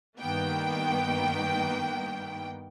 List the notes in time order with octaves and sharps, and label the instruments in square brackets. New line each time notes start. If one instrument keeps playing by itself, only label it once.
[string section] G2 D#3 A#3 B3 G5